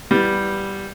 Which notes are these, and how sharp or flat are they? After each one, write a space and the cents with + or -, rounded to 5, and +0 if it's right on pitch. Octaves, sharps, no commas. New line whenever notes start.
E3 +0 G3 +0 B3 +0